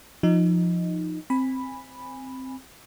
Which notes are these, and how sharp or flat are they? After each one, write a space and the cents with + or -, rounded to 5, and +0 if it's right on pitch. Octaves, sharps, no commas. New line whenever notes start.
F3 +0 D#4 +0
C4 +0 G#5 -15 B5 +0